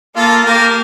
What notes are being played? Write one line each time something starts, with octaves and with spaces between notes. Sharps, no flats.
A#3 F4 A4
A#3 G4 A#4